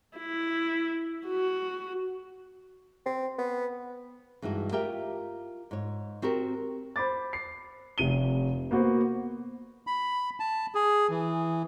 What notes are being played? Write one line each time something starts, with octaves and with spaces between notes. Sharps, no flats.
E4
F#4
C4
B3
G2 E3 G#3 D#4 F#4
F4 G4 A#4 E5 G5
G#2 C#5
C4 F#4 G4 A#4
C5 B5 D6 A6
C7
F1 C3 D#7 G7
A#3 B3 F#4 C5
B5
A5
G#4
E3